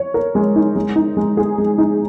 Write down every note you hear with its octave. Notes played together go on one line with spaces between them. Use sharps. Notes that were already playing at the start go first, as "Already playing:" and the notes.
Already playing: C#5
A#4
G#3
D#4
G#3
D#4
G#3
G#4
G#3
D#4